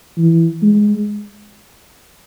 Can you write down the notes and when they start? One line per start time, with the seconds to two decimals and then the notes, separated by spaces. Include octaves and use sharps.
0.18 E3
0.62 G#3